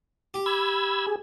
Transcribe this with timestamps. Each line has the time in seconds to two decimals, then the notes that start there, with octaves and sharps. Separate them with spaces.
0.34 G4
0.46 B5 E6 G#6
1.07 G#4